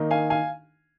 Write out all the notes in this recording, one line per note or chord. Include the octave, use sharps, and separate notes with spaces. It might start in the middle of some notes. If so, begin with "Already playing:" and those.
Already playing: D#3 A#3 D#4
F5 G#5
F5 G#5